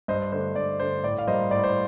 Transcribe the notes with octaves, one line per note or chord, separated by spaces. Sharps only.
G2 C5 D#5
D3 A3 C5
G2 D5
D3 A3 C5
A2 D5
F5
G3 A#3 C5 D#5
A2 D5
C5